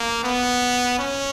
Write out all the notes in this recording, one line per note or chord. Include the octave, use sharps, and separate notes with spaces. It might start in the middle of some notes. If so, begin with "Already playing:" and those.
Already playing: A#3
B3
C#4